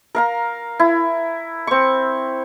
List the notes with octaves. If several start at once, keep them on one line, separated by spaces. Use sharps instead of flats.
A#4 F5 A#5
E4
C4 C#6